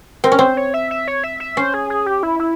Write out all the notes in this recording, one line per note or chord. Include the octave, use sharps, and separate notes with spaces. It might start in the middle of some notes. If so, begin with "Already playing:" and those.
C4 A#4
C#4
C4 C5
C#5
E5
E5
C#5
E5
E5
C#4 C5
G#4
G#4
G4
E4
E4